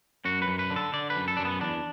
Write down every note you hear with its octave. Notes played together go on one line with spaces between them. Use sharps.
F#2 F#4
B4
F#2
B4
D3
A4
D3 D5
B4
F#2
A4
F#2 D4
B3
E2 D4